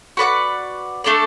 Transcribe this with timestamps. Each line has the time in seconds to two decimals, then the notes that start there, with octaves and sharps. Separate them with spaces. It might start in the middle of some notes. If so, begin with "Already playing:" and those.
0.17 F#4 B4 D5 F#5
1.04 A3 D4 A4 D5